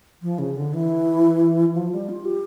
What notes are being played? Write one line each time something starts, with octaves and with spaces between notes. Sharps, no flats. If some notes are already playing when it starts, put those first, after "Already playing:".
F3
C#3
D3
E3
F3
G3
F4
G4